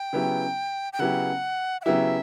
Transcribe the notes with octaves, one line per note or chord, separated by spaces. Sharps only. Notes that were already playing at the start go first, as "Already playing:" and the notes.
Already playing: G5
C#3 F#3 B3 E4 G4
G5
C#3 F#3 B3 E4 G4 F#5
F#5
C#3 F#3 B3 E4 G4 E5